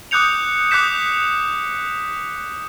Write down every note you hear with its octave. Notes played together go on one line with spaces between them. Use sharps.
D6 D#6 F#6 G6 C#7 F7
D6 D#6 F#6 G6 B6 E7